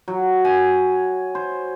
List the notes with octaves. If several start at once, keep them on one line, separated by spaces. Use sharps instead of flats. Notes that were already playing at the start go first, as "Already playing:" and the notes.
F#3
G#5
C5